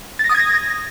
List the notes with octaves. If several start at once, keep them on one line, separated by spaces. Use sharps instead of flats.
A6
A#6
D#6
G#6
A#6